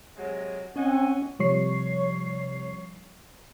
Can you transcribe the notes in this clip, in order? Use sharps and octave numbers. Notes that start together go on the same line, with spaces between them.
C3 F#3 G#3
C4 C#4 D#5 F#5 G#5
C3 F3 G3 C#5 C#6 C7